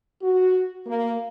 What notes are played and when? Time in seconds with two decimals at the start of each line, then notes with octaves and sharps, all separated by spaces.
0.21 F#4
0.87 A#3